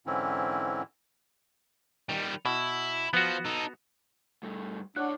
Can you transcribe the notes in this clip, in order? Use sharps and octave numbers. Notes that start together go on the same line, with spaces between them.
G#2 D3 E3 C4 C#4 E4
D#3 G3
B2 E4
F3 B3 F#4
D#4 A4
G2 A3
D4 E4 C#5 F#5